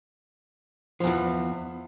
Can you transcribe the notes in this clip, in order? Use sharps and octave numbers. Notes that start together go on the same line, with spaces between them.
E2 E3 F3